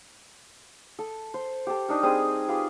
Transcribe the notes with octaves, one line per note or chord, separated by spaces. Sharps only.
A4
C5
G4 A4
D4 D#4 A#4
G3 C4 G#4 D#6
F4 G4 G#4 B4